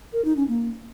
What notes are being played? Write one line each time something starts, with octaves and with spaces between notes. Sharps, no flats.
A#4
D#4
C#4
A#3